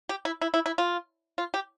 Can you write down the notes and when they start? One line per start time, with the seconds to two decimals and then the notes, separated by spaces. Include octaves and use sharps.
0.09 G4
0.25 E4
0.41 E4
0.54 E4
0.66 E4
0.78 F4
1.38 F4
1.54 G4